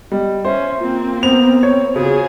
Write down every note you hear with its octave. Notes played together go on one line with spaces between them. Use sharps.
G3 D#5
C#4 C5 E5
A#3 C4 F4
B3 C5 F7
C#5
C#3 F4 F#4 G#4